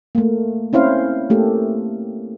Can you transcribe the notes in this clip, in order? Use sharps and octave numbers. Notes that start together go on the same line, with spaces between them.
A3 A#3
C4 C#4 E4 C5 F5
A3 A#3 G4 A4